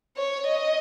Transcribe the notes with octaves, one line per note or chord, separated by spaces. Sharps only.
C#5
D#5